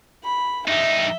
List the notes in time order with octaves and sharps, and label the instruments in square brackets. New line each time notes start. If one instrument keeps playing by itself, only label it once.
[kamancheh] B5
[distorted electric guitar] G2 D#4 [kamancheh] E5